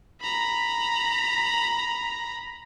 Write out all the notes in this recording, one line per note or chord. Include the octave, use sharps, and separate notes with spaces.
A#5 B5